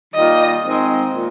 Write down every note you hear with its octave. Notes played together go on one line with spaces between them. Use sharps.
D#3 G3 A#3 F4 D#5
D#3 G#3 C4
A#2